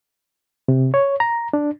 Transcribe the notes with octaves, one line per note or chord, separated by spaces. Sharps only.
C3
C#5
A#5
D4